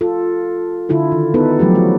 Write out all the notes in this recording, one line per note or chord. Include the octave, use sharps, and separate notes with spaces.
F4 A4
D3 E4 F4 A4
D#3
B3 D#4 E4 A4 B4
F3 F#3 A3 G4
F#4